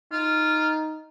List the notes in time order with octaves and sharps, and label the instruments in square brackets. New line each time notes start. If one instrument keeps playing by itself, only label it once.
[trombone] D#4 [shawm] F4